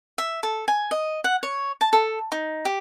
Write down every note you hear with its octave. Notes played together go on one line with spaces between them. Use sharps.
E5
A4
G#5
D#5
F#5
C#5
A5
A4
D#4
G4